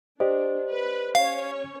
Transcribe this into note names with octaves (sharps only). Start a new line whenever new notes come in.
D4 G4 C5 D5 D#5
B4
C#4 C#5 F5